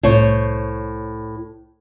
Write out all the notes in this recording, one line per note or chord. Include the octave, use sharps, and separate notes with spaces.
C2 A2 C5 C#5